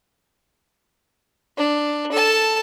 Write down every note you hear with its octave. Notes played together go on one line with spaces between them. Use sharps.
D4
A4 A5